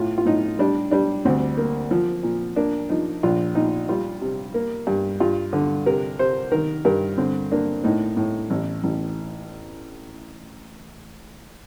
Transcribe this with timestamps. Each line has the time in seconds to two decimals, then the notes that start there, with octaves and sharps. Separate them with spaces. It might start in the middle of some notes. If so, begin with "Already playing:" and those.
Already playing: A2 F4
0.18 F4
0.25 A2 D#4
0.59 G3 D4
0.91 G3 D4
1.25 D2 C4
1.57 A#3
1.91 F3
2.23 A#2
2.56 A#3 D4
2.89 F3 D#4
3.23 A#1 F4
3.55 A#2 D#4
3.89 G3 F4
4.21 C3
4.54 A#3
4.87 G2
5.20 G2 F4
5.53 D3
5.86 C3 A#4
6.19 C3 C5
6.52 D#3 A#4
6.85 G2 A#4
7.18 D3 C4
7.52 A#3 D4
7.84 A2 D#4
8.17 A2
8.50 A1
8.83 A1